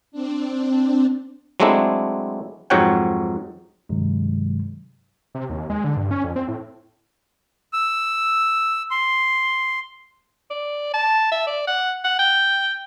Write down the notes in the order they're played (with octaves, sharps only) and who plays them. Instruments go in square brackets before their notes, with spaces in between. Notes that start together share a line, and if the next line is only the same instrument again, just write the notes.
[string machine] C4 D4
[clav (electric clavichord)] F#3 G#3 A3 C4 D4 E4
F2 G#2 F#3 C#5 F#5 G5
[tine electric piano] G2 C3 D#3 F#3 G#3
[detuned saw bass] C3
D#2
G#3
D3
G2
C#4
F2
C4
A2
[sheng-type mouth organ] E6
C6
[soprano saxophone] D5
A5
E5
D5
F#5
F#5
G5